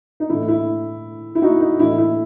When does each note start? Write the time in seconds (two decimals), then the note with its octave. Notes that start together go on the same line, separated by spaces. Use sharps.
0.20 D#4
0.30 A2 E3 E4
0.48 E4
1.35 E4
1.42 D#4 F#4
1.61 D#4
1.79 A2 E3 E4
1.98 E4